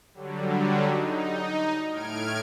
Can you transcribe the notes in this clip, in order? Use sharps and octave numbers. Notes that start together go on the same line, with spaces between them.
D3 F#3 G3
D#4
A2 F6 G#6 D7